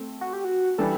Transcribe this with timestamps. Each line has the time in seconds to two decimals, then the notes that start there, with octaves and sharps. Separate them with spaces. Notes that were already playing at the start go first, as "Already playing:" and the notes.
Already playing: A3 C4
0.21 F#4
0.33 G4
0.45 F#4
0.78 E3 G3 D4 G4 A4